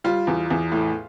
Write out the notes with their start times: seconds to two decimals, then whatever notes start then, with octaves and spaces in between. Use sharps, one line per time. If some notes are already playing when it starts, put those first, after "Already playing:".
0.04 G3 F4
0.27 E2
0.50 E2
0.72 A2